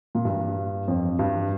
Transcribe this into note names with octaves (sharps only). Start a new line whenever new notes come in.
A#2
G2
F2
G2